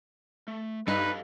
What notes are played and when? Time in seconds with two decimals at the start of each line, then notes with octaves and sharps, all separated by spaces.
0.48 A3
0.88 G2 D#4 A4 B4 D#5 F5